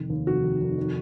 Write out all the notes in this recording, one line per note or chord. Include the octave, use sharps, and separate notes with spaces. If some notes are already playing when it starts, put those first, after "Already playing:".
Already playing: F1 D#3
D#2
F1 F#4
D#3
F1
D#3